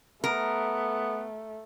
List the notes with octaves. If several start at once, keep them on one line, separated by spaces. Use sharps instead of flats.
A3 B3 A#4